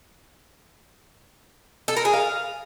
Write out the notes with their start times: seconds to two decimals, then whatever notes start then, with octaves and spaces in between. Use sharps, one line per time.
1.88 A4
1.97 A#4
2.05 G#4
2.13 F5